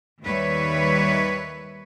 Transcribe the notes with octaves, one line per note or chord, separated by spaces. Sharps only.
D#2 D#3 G3 B4 C#5 E5